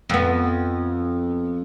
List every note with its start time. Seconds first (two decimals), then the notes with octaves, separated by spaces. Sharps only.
0.10 F2 B3